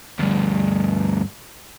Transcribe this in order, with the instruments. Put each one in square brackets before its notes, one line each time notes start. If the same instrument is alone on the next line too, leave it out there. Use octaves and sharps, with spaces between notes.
[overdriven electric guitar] D2 G2